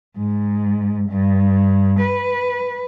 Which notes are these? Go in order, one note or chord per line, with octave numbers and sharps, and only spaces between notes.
G#2
G2
B4